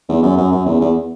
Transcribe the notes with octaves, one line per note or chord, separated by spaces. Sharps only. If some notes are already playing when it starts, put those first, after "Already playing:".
E2
F#2
F#2
F#2
E2
E2